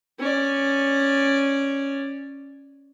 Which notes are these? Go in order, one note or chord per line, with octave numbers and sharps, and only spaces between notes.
C#4 D5